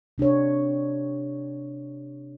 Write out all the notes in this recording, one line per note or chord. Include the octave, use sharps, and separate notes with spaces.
C3 D4 G4 C#5